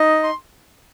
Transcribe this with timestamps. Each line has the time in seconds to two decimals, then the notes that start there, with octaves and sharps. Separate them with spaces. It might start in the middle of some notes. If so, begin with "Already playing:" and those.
Already playing: D#4 D#5
0.23 C6